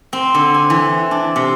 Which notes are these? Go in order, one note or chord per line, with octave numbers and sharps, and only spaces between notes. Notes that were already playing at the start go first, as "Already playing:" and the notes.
C4
D3
G#5
E3
D4
C3